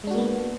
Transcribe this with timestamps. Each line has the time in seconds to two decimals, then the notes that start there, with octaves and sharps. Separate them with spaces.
0.04 G#3
0.07 D4
0.11 F#4
0.14 A#3
0.18 B3